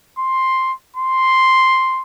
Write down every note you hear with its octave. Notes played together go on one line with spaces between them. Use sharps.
C6
C6